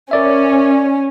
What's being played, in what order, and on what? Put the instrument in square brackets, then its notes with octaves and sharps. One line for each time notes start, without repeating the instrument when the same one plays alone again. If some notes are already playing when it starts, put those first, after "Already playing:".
[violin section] C#4 [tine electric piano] A#4 D5 E5